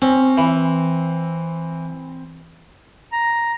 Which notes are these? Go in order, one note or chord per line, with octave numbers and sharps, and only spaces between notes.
C4 C#4
E3
A#5